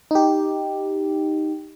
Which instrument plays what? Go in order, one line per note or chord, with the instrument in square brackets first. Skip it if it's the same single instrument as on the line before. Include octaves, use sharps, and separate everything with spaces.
[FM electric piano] D#4 G4